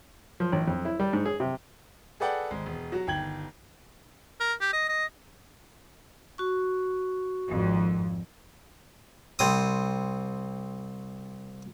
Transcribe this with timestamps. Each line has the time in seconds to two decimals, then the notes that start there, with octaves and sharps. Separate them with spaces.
0.40 F3
0.52 A1
0.68 F2
0.85 E4
1.00 G3
1.13 G#2
1.25 G#4
1.40 C3
2.20 G#4 A4 B4 D5 F#5 G5
2.50 G#1 G#3
2.66 E1
2.92 F#3 F#4
3.07 G1 D#3 G5 G#6 F#7
4.40 A#4
4.61 G4
4.73 D#5
4.89 D#5
6.38 F#4 C#6
7.48 G#1 F2
9.39 C2 C4 D#6